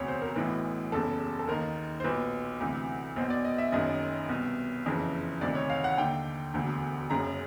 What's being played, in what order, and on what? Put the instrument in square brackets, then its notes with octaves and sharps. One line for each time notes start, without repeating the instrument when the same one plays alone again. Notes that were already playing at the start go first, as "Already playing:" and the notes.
Already playing: [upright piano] E1 D2 C3 C#5
C5
A#4
B1 A2 E3 B4
F#1 E2 C#3 A4
A4
D#2 D#3 A#4
C5
B1 A#2 B4
D2 C3 E3
B1 B2 C5
D5
D#5
E5
F#1 F#2 D#3 D#5
C2 B2
F#1 F2 C#3 E3
D2 C3 D#3 D5
C#5
F5
F#5
D#2 D3 G5
E1 D2 D3
F#1 F#2 C#3 A#5